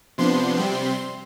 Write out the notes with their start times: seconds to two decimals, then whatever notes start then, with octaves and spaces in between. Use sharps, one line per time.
0.18 C3 F3 B3 D4 C6
0.57 C3 G3 C4